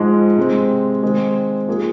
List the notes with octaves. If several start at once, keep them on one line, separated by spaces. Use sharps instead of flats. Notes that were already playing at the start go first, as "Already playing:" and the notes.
Already playing: G#2 F3 G#3
C3 G#3 C4
D#3 G#3 C4
F3 A#3 G#4